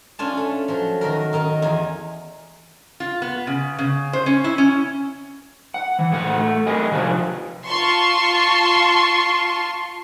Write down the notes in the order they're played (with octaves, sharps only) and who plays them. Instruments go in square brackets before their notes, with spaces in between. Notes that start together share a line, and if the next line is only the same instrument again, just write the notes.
[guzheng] C#4 D4 F4 G#5 A5
A3
F3 F#3
D#3 F#4 A#4
D#3 D#4 A#4
E2 G#5
[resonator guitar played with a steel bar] F4
B3
C#3
C#3
C5
C#4
E4
C#4
[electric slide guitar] F#5
E3
A2 A3 F#5
A3
G4 A#4 D#5 G#5
C3 F3 B4 F5
[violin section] F4 A5 C6 C#6